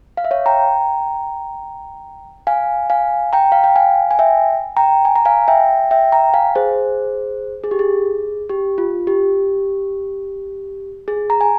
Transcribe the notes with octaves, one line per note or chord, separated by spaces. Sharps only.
F5
E5
C#5 F5
G5 A#5
F5 G#5
F5 G#5
G5 A#5
F5
G5
F5 G#5
G#5
E5 G5
G5 A#5
G#5
A#5
F5 G#5
E5 G5
E5 G5
G5 A#5
F5 G#5
G#4 C5
G#4
G4
G#4
G4
F4
G4
G#4
A#5
G#5